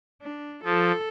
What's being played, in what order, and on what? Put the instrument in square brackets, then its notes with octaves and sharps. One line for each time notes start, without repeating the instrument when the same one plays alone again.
[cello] D4
[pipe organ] F3 [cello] A4